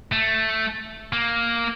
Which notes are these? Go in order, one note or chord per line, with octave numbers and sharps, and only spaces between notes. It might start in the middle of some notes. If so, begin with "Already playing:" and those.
A3
A#3